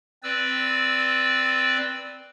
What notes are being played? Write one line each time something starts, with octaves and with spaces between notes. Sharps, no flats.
C4 B4 D5 E6